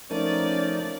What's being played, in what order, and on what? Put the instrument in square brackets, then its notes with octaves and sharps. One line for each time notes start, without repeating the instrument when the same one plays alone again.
[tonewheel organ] F3 A3 D#4 [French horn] C#4 [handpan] A#4 [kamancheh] D5